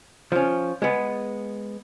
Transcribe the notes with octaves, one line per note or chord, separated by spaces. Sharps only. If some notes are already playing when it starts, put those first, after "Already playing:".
F3 C#4
G#3 B3